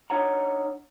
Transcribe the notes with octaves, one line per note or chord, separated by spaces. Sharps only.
D4 D#4 C#5 F#5 A#5